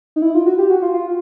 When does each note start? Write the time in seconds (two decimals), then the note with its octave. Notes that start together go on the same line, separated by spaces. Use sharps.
0.16 D#4
0.22 E4
0.34 F4
0.46 F#4
0.58 G4
0.70 F#4
0.82 F4
0.94 F4